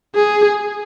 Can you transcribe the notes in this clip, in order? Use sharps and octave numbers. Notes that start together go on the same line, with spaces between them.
G#4